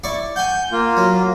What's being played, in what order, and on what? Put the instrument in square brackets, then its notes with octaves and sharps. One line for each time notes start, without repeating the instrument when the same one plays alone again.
[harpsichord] E4 D5 C#6
[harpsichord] F#5 G#5 [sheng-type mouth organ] G6
[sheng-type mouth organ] A#3 F4
[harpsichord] F#3